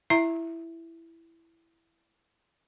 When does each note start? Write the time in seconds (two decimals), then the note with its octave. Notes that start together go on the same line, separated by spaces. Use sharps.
0.10 E4 E5 A#5